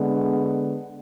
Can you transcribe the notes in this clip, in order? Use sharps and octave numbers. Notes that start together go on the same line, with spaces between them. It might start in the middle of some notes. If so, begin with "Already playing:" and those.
Already playing: D3 G#3 B3